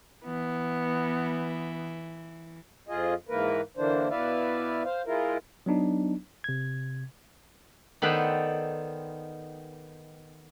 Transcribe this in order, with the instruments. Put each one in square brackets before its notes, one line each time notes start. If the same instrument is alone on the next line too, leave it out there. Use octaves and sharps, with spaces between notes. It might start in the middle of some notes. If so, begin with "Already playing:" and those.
[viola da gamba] E3 [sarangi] B3
[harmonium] F2 F4 G#4 D#5
G#2 E3 A#3 A#4 B4
D3 E3 A#3 D4 C5
B2 E4 B4 D5 E5 F5
C5 F5
G#3 E4 F4 A#4
[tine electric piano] F#3 B3 D4 D#4
C3 G#6
[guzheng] D#3 B3 A4 B4 C5 D5